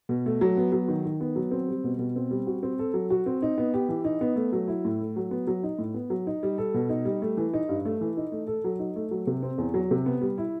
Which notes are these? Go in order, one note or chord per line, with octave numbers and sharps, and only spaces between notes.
B2
A3
F#3
B3
F#3
D#3
D#3
B3
F#3
C4
G3
B2
B2
C4
G3
F#4
C4
A4
F#3
F#4
C4
D#4
B3
G4
E3
D#4
B3
A3
F#3
E4
A2
A3
F#3
B3
F#3
D#4
A2
B3
F#3
D#4
G3
A4
B2
D#4
G3
A3
E3
D#4
G2
A3
E3
D#4
A3
A4
F#3
D#4
A3
F#3
C3
C4
E2
F#3
C3
B3
G3
E4